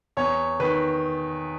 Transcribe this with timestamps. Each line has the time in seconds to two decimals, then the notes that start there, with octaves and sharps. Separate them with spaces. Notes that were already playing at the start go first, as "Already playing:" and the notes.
0.17 E2 C#5
0.60 D#3 B4